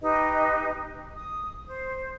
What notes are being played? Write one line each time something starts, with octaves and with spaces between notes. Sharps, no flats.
D#4 G4 B4 D#5
D#6
C5